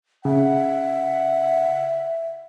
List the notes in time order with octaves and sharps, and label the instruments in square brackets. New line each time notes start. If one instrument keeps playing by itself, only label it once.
[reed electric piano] C#3 [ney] E5 [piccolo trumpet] F#5